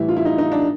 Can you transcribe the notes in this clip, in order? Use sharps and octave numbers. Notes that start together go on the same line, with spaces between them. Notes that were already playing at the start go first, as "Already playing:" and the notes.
Already playing: A2 E3 G3 E4
F4
E4
D#4
D#4
D4